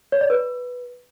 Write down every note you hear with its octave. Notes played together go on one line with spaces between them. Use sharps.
C#5
D5
B4